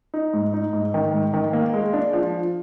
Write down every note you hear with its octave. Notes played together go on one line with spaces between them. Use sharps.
D#4
G#2
D#4
G#2
D#3
G#2
D#3
A#3
G#3
D4
F3